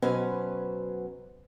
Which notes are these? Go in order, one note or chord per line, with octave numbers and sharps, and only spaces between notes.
B2 F#3 C#4 B4 C5